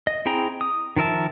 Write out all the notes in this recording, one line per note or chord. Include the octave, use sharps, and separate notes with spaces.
D#5
C4 E4 G#4 G5 A#5
D#6
D#3 F3 A#4 E5 A5